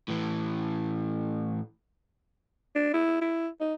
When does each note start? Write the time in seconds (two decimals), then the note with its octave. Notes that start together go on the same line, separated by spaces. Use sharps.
0.08 A2 E3
2.75 D4
2.93 E4
3.21 E4
3.61 D#4